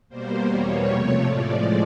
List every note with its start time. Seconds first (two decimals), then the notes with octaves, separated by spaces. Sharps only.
0.09 B2 G3 A#3 C5
0.47 E2 B2 G3 A#3 C#5
0.85 C3 F3 A3
1.23 A2 F3 G#3 D5